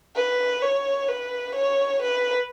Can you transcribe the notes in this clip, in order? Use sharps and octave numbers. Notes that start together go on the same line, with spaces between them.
B4
C#5
B4
C#5
B4